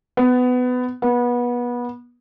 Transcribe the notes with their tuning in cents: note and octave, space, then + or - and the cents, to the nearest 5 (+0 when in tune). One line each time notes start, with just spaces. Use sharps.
B3 +20
B3 -25